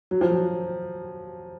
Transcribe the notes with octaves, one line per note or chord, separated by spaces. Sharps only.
F#3
F3
F#3